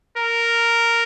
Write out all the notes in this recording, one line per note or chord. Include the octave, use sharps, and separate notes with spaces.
A#4